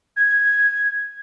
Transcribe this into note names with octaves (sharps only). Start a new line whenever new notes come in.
G#6